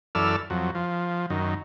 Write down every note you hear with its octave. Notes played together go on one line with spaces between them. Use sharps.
F#2 E3 A4 D5 E6 F6
F2 F#3
F3
F#2 D#3